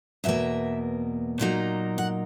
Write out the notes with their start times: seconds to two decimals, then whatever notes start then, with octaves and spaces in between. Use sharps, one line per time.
0.24 E2 B2 A#3 E5
1.39 A#2 F#3 A#3 D#4
1.98 F#5